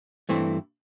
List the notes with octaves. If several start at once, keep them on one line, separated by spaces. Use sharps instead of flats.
G2 E3 A3 C4 E4